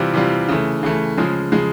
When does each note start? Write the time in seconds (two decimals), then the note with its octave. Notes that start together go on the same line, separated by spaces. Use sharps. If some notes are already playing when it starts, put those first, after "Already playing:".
Already playing: C3 E3 G3 C4 F4
0.13 C3 E3 G3 C4 F4
0.48 C#3 E3 A3
0.83 C#3 E3 A3
1.17 C#3 F3 G#3
1.52 C#3 F3 G#3